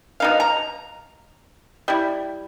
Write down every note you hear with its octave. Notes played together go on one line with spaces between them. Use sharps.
B2 D#4 F5
A#5
G3 E4